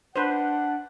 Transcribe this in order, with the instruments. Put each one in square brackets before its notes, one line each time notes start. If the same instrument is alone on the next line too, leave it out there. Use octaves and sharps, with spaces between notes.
[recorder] D4 [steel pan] B4 C5 [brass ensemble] F#5